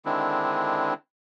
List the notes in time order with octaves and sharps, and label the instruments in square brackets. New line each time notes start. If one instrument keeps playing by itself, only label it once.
[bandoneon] D3 D#3 G#3 C4 D4 E4